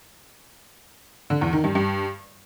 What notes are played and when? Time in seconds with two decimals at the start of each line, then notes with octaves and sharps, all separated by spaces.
1.30 D3
1.41 E2
1.53 D#3
1.64 G2
1.75 G2